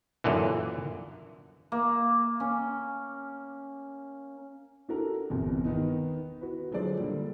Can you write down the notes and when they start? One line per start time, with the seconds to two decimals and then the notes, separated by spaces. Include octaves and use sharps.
0.24 F#2 A#2 D3 E3
1.72 A#3
2.40 C#4
4.89 D4 F#4 G4 A4 A#4
5.30 G1 E2 C3
5.65 D#3 B3 D#4
6.41 F#4 B4
6.71 D3 F3 F#3 G#3 C5 D5
6.99 D3 G3 A#3